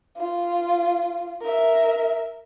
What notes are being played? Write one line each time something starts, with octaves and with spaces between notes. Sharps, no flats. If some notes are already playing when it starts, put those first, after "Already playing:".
F4
A#4 E5